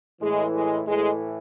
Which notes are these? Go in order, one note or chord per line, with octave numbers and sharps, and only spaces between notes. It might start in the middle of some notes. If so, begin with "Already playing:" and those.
A2 E3 G#3
G#3
A2 E3 G#3